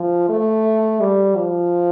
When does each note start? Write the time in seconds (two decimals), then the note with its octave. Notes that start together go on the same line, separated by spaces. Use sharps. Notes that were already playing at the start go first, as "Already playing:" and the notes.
Already playing: F3
0.29 A3
1.00 G3
1.36 F3